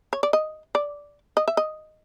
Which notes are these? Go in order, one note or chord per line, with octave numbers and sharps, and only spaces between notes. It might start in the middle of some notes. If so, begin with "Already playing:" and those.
C#5
D5
D#5
D5
D#5
E5
D#5